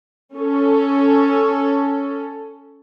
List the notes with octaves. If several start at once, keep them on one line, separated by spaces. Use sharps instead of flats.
C#4 A4